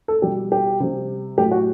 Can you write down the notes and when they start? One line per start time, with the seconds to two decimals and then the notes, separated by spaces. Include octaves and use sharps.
0.08 A4
0.22 B2 G3 G4
0.52 G4
0.80 C3 G3
1.37 A2 F#3 A3 G4
1.51 F#4